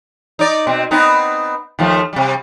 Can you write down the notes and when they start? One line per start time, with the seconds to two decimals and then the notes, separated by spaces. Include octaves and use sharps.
0.39 D#4 D5
0.67 B2 C4
0.91 B3 C4 D#4
1.79 D#2 F3 A3
2.13 C3 G3